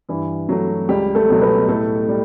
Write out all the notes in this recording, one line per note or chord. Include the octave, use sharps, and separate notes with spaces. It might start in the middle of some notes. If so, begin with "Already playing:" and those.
G2 E3 E4
F#3 A3 F#4
C#2 G3 G4
A3 A4
B2 F#3
B3 B4
A2 A3 A4
G3